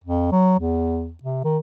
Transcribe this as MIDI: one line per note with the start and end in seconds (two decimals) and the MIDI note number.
0.04 0.29 41
0.32 0.56 54
0.59 1.14 40
1.23 1.43 48
1.44 1.59 51